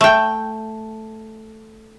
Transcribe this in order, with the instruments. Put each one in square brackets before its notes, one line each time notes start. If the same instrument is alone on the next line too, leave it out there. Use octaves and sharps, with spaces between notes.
[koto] A3 G5